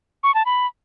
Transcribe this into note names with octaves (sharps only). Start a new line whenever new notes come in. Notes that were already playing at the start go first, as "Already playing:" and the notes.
C#6
A5
B5